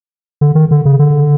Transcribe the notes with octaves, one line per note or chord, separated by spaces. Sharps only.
D3
D#3
D3
C#3
D3